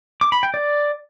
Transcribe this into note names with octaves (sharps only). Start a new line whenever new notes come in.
D6
B5
G5
D5